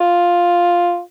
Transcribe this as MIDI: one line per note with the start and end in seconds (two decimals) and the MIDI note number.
0.01 1.01 65